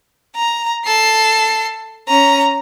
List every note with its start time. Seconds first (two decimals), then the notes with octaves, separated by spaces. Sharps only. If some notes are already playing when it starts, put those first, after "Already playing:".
0.36 A#5
0.86 A4 C7
2.08 C#4 A#5